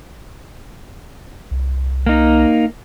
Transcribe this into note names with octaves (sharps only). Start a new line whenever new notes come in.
C2
A#3 D#4